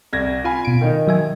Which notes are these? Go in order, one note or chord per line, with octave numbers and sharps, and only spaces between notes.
C2 G#6 A#6
F4 G#5 B5
B2 D7
D#3 D#4
F#3 E5 G#5